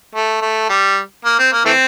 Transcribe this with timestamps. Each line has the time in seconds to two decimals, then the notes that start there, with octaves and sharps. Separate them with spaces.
0.15 A3
0.42 A3
0.69 G3
1.25 A#3
1.39 C4
1.52 A#3
1.65 E3 A3 C4